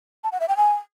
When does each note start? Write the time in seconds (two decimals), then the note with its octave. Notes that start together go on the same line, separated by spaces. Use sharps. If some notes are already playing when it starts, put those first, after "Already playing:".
0.24 A5
0.32 F#5
0.40 E5
0.49 G5
0.57 G#5